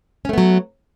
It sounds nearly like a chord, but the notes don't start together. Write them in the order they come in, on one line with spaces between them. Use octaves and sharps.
C#4 A3 B3 F#3